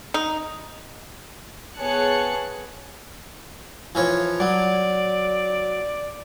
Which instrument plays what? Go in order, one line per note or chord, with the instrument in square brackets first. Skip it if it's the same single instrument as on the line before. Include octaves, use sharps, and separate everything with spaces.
[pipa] D#4
[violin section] B3 G#4 C#5 A5 F#6 C#7
[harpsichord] E3 F3 C#5
[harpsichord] F#3 [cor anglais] D5